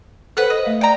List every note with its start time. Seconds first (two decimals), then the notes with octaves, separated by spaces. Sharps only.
0.37 A4 B4 C5 F#5 F#6
0.50 D#5
0.65 A3 F5
0.81 D5 G5 A#5